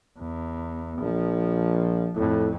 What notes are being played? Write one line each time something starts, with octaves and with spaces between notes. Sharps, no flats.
E2
A#1 F3
F2 A2